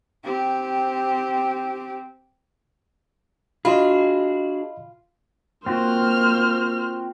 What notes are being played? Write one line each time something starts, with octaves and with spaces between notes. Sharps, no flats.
C4 G4
D4 F4 F#4 G#4 D#5 B5
A#3 C4 F4 F#4 C5 F6